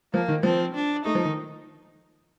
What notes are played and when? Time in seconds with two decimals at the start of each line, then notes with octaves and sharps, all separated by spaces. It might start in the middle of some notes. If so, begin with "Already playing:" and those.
0.13 F3 A#3
0.28 D#3
0.43 F3 C4
0.75 D4
1.05 A3 D#4
1.15 F3
1.25 D#3